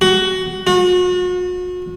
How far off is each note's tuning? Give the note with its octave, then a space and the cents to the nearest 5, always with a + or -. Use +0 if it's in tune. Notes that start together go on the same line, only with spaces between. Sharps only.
F#4 +15
F#4 -40